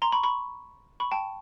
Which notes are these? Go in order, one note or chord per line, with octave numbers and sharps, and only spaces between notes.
A#5 C6
B5 C#6
B5 C#6
B5 C#6
G5 A5